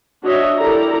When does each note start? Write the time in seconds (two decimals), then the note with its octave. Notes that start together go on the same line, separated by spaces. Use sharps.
0.23 D4 F#4 C#5 D#5 E5
0.59 E4 G4 A4 A#4 D5 A#5